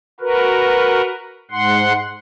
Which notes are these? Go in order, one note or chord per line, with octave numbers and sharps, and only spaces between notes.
F#4 A#4 B4
G#2 F#5 C6